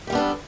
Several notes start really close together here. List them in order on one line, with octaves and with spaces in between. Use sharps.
G4 G3 B3 D4 A4